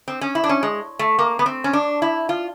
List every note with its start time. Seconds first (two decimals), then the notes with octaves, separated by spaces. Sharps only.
0.08 C4
0.21 C#4
0.35 E4
0.44 D4
0.49 C#4
0.63 G#3
0.99 A3
1.19 A#3
1.39 B3
1.46 C4
1.64 C#4
1.73 D4
2.02 E4
2.29 F4